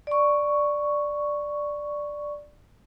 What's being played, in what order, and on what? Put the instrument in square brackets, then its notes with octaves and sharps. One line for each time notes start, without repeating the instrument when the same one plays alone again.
[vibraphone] D5 C#6